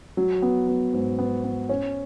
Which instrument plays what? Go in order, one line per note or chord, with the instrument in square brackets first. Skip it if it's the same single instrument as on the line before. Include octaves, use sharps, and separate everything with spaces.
[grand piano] F#3
B3
B3
G#2
B3
B3
C#4